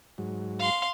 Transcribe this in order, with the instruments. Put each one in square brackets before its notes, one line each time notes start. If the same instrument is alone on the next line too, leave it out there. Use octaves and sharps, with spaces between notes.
[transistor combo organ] G#2 F#3
[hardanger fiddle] F5 C6